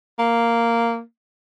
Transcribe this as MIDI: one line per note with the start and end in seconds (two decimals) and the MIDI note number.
0.19 1.00 58